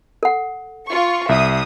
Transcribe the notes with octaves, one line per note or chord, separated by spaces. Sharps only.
A4 F#5
F4 C#6
C2 E5 D#6